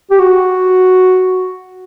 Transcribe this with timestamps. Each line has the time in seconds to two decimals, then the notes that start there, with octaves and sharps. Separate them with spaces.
0.11 G4
0.19 F#4